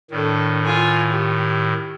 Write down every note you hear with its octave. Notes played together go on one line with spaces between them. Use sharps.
A2 D#3 D4 A4
F4 G#5
G4